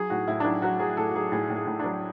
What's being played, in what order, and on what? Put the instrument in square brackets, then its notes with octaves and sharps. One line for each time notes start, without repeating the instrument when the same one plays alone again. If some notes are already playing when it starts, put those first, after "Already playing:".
Already playing: [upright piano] F#3 G#4
A2 F#4
A2 E4
D4
F#3 E4
F#3 F#4
F#3 G#4
A2 A4
F#4
F#3 G#4
A2 G#4
A2
G#4
A2
F#3 D4